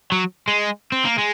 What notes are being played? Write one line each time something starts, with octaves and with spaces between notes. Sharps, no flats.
F#3
G#3
C4
A#3
G#3